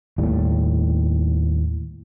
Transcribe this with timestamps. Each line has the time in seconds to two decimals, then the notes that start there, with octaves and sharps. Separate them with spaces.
0.18 D#2 A2 G3